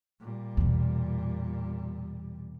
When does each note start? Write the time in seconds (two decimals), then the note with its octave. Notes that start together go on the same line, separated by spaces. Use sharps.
0.20 A#2 G3
0.57 E2 B2